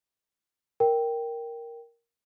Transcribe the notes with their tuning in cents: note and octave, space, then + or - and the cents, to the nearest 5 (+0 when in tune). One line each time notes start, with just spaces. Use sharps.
A#4 +0 G5 +0